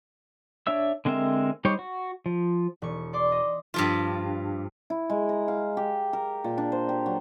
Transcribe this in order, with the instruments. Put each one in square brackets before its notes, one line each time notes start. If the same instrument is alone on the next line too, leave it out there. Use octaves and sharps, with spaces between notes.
[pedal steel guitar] D4 C#5 E5 E6
D3 G#3 C4 A#4 E5
G3 D#4 G4 C5 C#5
F#4
F3
[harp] E1 C#6
D5 C6 D6
D#5
[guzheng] G2 F3 F4
[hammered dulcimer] E4
G#3
A#5
F5
G4
A#4
A#2
D4
C5
G4
F#3